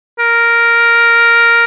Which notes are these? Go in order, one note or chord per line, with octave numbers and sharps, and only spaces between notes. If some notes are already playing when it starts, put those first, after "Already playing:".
A#4